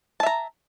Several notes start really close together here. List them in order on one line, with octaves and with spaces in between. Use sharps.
A5 E5 A#5